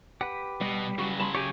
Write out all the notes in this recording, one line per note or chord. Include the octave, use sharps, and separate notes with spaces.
G4 B4 F#5
B2 G3
C#3 F#3 F#4
A5 B5 C6
G4 C#5 G5 G#5